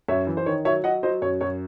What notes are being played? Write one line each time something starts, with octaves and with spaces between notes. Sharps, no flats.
F#2 C#5 E5
E3
C5
D#3 C#5
F#3 C#5 E5
F#3 D#5 F#5
F#3 C5 D#5
F#2 C#5
F#2 C#5